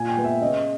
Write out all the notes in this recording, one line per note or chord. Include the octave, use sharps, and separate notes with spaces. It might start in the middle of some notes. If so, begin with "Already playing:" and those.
Already playing: A#2 G#5
G5
G#3 B3
E5
C#3 D#5